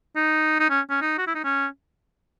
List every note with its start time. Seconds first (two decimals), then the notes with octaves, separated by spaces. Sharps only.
0.16 D#4
0.60 D#4
0.70 C#4
0.90 C#4
1.02 D#4
1.18 F#4
1.27 E4
1.35 D#4
1.44 C#4